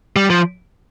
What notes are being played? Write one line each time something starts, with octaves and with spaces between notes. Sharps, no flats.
G3
F3